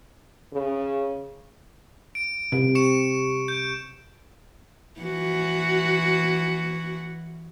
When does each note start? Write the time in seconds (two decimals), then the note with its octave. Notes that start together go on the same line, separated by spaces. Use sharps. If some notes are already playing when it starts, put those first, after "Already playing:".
0.53 C#3
2.15 D7
2.52 C3
2.75 C#6 C#7 E7
3.48 G6 D7
5.00 E3 F#4